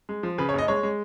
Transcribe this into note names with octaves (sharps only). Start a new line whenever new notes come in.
G#3
F3
C#3 B4
C#5
F#1 D#5
G#3 C#5
G#3